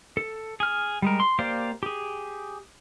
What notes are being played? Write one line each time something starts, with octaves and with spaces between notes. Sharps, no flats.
A4
G#4 F6
G3 G#3 A#4
C6
A#3 G4 C5 D5 F5
G4 G#4